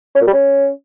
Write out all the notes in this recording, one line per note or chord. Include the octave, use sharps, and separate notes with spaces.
C#4
A#2
G3
C#4